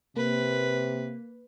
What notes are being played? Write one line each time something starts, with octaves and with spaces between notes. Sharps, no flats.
C3 A#3 B4